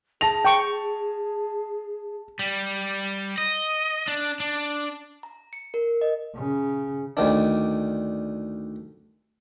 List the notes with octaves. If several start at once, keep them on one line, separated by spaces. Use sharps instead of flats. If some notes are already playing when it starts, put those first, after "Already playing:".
G#4 A5 A#6 F7
G5 C#6
G3
D#5
D4
D4
A#5
C#7
A#4
D#5
C#3
D2 D#3 D4